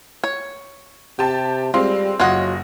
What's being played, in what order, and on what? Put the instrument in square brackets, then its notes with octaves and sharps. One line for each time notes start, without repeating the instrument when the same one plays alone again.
[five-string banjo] C#5
[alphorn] C3 [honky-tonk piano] G4 A5
[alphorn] G3 [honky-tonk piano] G#3 C4 [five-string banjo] F4
[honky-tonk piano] F#1 D#5 [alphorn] F#3 [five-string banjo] F4 C#5 F#5